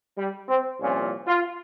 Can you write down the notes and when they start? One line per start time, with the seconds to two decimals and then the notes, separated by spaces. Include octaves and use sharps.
0.18 G3
0.49 C4
0.79 C2 A#2 F3 C#4
1.26 F4